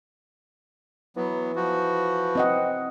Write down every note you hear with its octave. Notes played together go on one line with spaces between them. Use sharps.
E3 F#3 B3
F3 F#4
C4 D#5 F#5